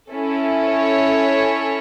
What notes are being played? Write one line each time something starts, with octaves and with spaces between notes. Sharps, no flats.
C#4 E4 A4
C#5